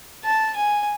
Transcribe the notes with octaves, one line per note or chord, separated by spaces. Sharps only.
A5
G#5